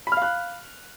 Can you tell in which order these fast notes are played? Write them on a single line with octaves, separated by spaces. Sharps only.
B5 F6 F5 F#6